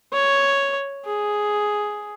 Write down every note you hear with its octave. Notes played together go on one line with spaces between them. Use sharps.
C#5
G#4